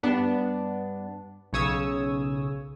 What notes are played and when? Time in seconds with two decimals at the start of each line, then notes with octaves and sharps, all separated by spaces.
0.03 G2 B3 D4
1.53 B1 C#3 C#5 D#6 E6 G#6